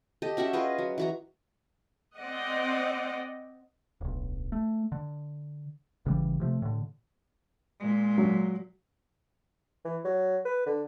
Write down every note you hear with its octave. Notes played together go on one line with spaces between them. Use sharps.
G4 A4 D#5
C#4 F#4 E5 G5
F4 G#4 B4 D#5
F#3
E3 F#4 A#5
C4 D5 D#5 F#5
D1 B1
A3
D3
G#1 C#3 E3 G3
C3 F3 A3
A2 D3
A#2 G#3
F#3
E3
F#3
B4
D3